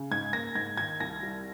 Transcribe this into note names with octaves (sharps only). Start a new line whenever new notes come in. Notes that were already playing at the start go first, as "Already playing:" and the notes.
Already playing: C#3
G#2 G#6
A#3 A#6
G#2 G#6
D#3 G#6
C2 A#6
G3